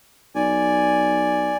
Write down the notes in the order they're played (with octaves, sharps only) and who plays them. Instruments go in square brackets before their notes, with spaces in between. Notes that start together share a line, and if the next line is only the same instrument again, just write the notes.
[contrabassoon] B1 [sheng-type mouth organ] D5 G#5